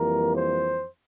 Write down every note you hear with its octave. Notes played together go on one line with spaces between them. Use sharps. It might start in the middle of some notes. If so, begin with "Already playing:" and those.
Already playing: F2 E3 G3 A#3 A#4
C5